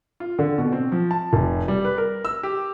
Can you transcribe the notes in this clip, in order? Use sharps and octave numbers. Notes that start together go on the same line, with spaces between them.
F4
D3
B2
C4
F3
A5
F1
G3
B4
A#4
E6
G4